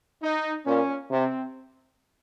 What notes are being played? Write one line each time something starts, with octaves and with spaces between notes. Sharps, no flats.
D#4
A#2 C#4
C3 C4